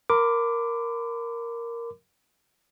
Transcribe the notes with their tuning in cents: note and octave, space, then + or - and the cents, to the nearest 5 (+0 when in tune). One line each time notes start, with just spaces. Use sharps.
A#4 +0 B5 +45 D6 +0